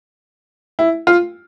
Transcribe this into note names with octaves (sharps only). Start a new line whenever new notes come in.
E4
F4